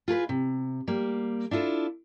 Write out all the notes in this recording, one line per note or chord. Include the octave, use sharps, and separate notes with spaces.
F4 G#4 A#4 B4
C3
G3 A#3
D4 E4 F4 A4